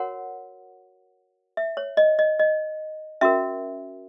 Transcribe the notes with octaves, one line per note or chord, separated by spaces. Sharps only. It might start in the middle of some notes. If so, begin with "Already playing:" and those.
Already playing: F#4 A#4 C#5 F#5
E5
C#5
D#5
D#5
D#5
C#4 F#4 A#4 E5